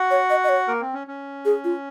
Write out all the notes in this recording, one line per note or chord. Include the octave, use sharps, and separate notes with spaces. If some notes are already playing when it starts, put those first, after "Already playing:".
Already playing: F#4 F#5
C#5
D#5
D#5
C#5
A#3 A#4
C4
C#4
C#4
G#4
F4